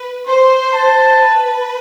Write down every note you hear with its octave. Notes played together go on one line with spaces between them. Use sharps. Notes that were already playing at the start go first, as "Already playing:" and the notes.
Already playing: B4
C5 C6
A5
B4